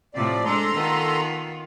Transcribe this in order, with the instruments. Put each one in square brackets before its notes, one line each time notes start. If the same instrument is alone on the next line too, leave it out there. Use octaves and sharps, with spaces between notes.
[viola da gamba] A2 C3 [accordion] F3 D5
[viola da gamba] G#3 D4 C5 [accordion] A4 A#5 C6
[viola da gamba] D#3 B3 F4